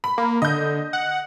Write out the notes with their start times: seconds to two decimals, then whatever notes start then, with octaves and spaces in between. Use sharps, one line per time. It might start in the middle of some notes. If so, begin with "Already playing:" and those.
0.04 B5
0.18 A#3
0.42 D3 D#5 G6
0.93 F#5